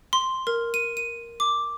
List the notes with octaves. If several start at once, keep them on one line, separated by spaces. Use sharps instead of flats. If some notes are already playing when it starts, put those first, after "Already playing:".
C6
A#4
D#7
D#7
D6